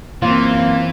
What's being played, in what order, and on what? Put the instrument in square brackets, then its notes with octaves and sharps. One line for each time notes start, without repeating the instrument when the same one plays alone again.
[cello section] F#2 C4 [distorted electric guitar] E3 [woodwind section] A#3 [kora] F4